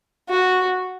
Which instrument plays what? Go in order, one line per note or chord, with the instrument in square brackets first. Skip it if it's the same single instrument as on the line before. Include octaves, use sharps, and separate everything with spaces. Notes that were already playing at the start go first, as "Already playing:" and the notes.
[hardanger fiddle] F#4